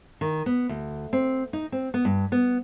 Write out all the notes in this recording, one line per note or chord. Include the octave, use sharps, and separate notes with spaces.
D#3
B3
D2
C4
D#4
C4
B3
G2
B3